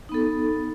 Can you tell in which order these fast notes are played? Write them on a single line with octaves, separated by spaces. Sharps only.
D#4 B3 A4